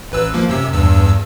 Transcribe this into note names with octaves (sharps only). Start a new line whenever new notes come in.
A1 B4 E6
F3 A#3
F#2 C3 E6
E2 G2 E6